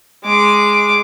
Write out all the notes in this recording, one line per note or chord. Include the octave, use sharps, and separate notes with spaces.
G#3 D6